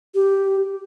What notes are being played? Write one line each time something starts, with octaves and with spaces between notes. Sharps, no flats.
G4